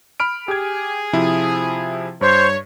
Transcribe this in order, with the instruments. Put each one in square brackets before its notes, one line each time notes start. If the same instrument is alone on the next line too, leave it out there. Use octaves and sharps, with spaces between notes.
[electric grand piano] B5 F6 D7
[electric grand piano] G4 G#6 [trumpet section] G#4
[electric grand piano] C3 F3 E4
[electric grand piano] G2 [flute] C5 [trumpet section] C#5